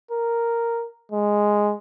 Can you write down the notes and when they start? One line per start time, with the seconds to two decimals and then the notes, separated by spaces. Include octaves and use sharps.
0.11 A#4
1.12 G#3